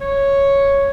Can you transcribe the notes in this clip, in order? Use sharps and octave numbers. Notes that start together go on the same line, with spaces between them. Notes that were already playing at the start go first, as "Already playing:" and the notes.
C#5